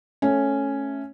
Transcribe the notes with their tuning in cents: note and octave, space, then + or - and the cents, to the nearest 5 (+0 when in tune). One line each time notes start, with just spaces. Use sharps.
A3 +0 C#4 -5